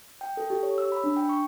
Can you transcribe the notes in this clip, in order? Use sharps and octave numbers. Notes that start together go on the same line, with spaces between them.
G5
A4
G4
C#5
E6
B5
D4
G5
C#6